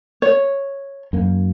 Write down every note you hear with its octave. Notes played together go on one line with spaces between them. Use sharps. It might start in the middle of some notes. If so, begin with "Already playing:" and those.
C#5
F#2 A#3